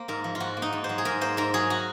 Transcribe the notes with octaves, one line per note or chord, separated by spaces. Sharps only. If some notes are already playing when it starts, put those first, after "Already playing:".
Already playing: A#3 C5
G#2 A#4
F3
F4
G#2 F#4
A#3
D#4
G#2
C5
F#3
G#4
G#2 A#4
A#3 C5
G#2 A#4
F#3 G#4
F#4